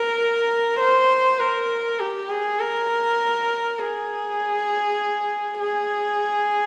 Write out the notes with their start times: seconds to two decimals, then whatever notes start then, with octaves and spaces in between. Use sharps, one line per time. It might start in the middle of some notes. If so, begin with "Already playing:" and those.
Already playing: A#4
0.80 C5
1.40 A#4
2.00 G4
2.30 G#4
2.60 A#4
3.79 G#4
5.60 G#4